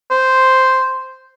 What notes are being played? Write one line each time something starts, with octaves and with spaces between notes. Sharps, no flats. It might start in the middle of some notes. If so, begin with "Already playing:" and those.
C5